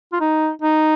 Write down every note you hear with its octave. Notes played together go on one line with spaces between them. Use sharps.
F4
D#4
D#4